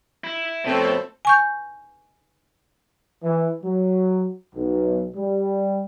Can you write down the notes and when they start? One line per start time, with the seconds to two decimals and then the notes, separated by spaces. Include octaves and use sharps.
0.24 E4
0.65 F2 B2 A3 C4 A4 C5 C#5
1.25 G#5 C#6 G6
3.23 E3
3.63 F#3
4.55 B1
5.16 G3